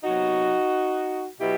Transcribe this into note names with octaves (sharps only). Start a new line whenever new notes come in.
C3 F#3 B3 D#4 F#4
B2 F#3 B3 E4 G4